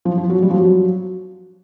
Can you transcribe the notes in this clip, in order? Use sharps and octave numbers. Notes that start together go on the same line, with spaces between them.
F3
F3
F#3
G3
F3
F#3